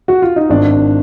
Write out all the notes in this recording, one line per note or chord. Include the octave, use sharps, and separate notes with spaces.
F#4
F4
D#4
G#1 D4